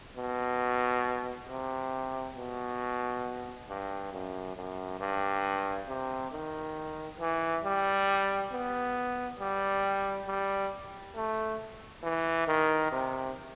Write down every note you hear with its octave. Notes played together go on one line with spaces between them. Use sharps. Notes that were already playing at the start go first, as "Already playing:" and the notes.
B2
C3
B2
G2
F#2
F#2
G2
C3
D#3
E3
G3
B3
G3
G3
A3
E3
D#3
C3